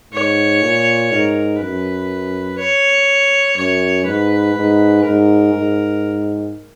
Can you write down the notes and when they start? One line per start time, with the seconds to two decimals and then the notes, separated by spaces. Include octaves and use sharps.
0.13 G#2 C#5
0.62 A#2
1.11 G#2 A#4
1.60 F#2 B4
2.59 C#5
3.57 F#2 C#5
4.06 G#2 B4
4.55 G#2
5.05 G#2 A#4
5.54 G#2